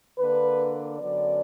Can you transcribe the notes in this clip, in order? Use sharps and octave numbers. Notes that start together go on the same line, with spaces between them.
D3 A#3 D4 B4
F#2 D3 F#3 B3 D5